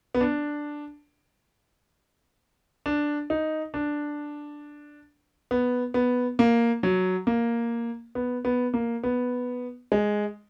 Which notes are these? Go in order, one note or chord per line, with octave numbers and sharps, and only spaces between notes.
B3
D4
D4
D#4
D4
B3
B3
A#3
F#3
A#3
B3
B3
A#3
B3
G#3